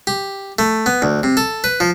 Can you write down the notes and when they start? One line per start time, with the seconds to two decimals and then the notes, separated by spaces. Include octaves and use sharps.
0.07 G4
0.59 A3
0.86 B3
1.02 D2
1.23 C3
1.37 A4
1.64 B4
1.80 F3